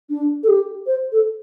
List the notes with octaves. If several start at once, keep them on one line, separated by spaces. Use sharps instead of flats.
D4
A4
G4
C5
A4